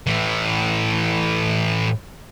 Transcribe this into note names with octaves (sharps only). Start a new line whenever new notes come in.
A2 E3